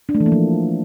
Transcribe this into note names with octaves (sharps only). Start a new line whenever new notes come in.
D4
A3
E3
A#3
F3